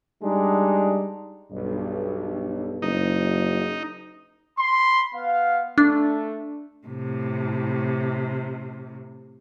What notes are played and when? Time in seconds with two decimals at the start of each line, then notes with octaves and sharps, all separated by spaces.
0.23 G3 G#3 D4 D#4
1.51 B1 G2
2.82 F#1 D#4
4.58 B5 C6
5.14 B3 F5
5.78 A3 D4
6.87 A2 C3